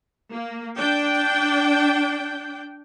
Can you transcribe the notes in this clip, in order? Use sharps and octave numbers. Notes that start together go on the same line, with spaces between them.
A#3
D4 G5